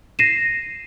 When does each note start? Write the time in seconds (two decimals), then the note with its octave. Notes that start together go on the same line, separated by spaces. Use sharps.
0.19 A#6 C7 D#7 E7